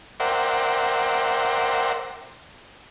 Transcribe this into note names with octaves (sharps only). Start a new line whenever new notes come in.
A#4 C5 D5 E5 F#5 G5